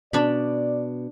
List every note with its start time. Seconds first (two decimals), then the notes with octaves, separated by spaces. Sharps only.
0.13 B2 D4 D5 B5